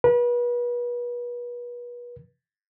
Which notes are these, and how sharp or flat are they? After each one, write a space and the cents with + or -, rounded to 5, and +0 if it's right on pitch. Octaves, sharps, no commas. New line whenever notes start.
B4 -35